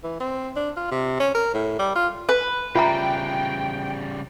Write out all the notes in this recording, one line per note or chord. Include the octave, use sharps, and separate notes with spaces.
E3
C4
D4
F4
C3
C#4
A#4
A2
G3
F4
B4
C#3 G3 F4 E5 G5 A#5